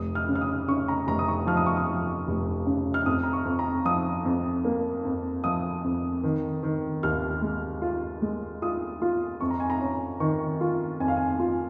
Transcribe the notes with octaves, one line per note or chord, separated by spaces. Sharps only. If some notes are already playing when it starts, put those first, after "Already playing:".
Already playing: F1 D#6
F6
C#3
F6
D#6
C#3 C#6
A#5
F1 A#5
D#6
C#6
F3 F6
D#6
C#6
D#6
F3
F1
C#3
F6
F2 D#6
A#5
C#6
F2
A#5
F3 D#6
F2
A#3
F2
F3 D#6
F2
D#3
D#3
D#2 F6
G#3
F4
G#3
F4 D#6
F4
F2 C#6
A#5
G#5
A#5
C#4
D#3 C#6
F4
F2 G#5
F5
G#5
F4